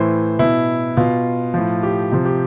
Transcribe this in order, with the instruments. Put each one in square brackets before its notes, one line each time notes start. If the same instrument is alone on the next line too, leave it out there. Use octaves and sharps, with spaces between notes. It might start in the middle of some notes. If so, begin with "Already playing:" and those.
Already playing: [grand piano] A2 E3 C5
B2 E4
B2 F4
A2 F3
G4
C3 F3
G4